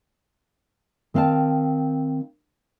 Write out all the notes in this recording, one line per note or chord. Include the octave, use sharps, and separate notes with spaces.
D#3 C4 F5 F#5 A5